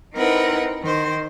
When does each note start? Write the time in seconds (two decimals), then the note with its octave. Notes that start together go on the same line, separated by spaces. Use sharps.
0.14 C4 D#4 E4 A#4 B4 F#5
0.82 D#3 C5